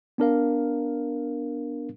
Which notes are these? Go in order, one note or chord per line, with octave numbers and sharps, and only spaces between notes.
B3 D4 A#4 F5